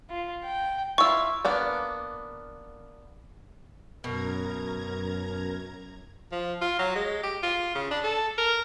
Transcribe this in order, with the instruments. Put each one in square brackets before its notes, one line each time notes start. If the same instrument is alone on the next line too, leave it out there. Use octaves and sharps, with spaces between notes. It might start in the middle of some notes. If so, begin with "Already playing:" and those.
[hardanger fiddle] F4
G5
[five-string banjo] E4 F4 [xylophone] C#6 E6
[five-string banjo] A#3 B3 D4
[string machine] F#2 A#5 G#6 [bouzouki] B2 [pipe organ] A#4
[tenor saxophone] F3
F4
F#3
G#3
G4
F4
C#3
D4
A4
A#4